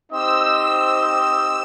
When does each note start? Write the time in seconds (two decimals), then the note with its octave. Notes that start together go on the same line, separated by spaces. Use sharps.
0.12 C4 D#4 G4 C5 D#5 E6
0.72 E6